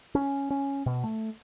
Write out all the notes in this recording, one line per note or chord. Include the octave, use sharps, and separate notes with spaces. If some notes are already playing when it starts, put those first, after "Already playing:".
C#4
C#4
B2
A3